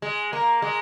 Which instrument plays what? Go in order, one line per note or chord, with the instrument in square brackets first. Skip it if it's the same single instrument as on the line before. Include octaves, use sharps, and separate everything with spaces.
[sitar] G#3
A#3
G#3